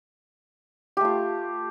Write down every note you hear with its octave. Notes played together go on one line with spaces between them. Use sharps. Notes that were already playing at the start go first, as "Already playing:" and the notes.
A3 F4 G4